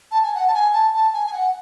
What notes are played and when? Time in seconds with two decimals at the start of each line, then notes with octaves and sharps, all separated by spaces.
0.11 A5
0.23 G#5
0.35 F#5
0.47 A5
0.54 G#5
0.73 A5
0.94 A5
1.13 G#5
1.27 G#5
1.33 F#5